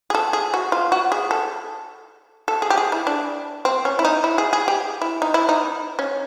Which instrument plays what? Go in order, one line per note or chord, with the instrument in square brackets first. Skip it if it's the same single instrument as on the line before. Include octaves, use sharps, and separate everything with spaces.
[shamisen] G#4
A4
G#4
F#4
F4
F#4
G#4
A4
A4
G#4
G4
G#4
E4
D4
C4
C#4
E4
D#4
E4
G#4
G#4
G4
E4
D#4
E4
D#4
C#4